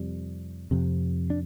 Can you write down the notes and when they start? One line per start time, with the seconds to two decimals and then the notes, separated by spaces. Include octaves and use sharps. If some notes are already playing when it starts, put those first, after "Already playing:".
Already playing: F2 C3 G3
0.71 F2 C3
1.30 D4